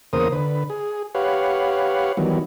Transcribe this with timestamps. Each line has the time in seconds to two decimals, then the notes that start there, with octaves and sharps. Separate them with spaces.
0.13 E2 C#3 A#3 A#4 C5 D#6
0.32 D3 B4
0.70 G#4
1.15 G4 B4 C#5 F5 F#5
2.17 D#3 E3 F#3 G3 B3